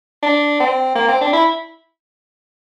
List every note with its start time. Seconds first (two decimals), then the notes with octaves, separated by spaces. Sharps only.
0.23 D4
0.60 C4
0.96 A#3
1.08 C4
1.21 D4
1.33 E4